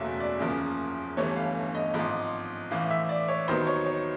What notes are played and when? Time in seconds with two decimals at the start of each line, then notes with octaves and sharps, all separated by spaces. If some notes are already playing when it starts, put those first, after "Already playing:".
Already playing: F#1 E2 B2 F#3 A3 E5 F5
0.20 D5
0.40 F#1 E2 C#3 F3 A#3
1.17 G1 G2 E3 A3 C#5
1.36 F5
1.75 D#5
1.94 G#1 G#2 F3 D#5
2.71 A1 A2 E3 F5
2.90 E5
3.09 D5
3.28 C#5
3.48 D#2 D#3 F#3 B3 C5
3.67 C#5
3.86 C#5